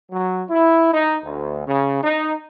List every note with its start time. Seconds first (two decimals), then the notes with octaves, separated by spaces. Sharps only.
0.11 F#3
0.49 E4
0.93 D#4
1.24 D2
1.66 C#3
2.02 D#4